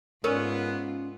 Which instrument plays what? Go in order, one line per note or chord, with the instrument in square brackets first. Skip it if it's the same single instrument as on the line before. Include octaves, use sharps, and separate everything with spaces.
[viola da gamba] G#2 F4 [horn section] B3 [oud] C#4 [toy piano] A#4